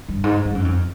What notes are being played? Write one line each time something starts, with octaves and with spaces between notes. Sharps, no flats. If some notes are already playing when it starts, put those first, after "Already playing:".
G2
G#2
G2
F#2
F2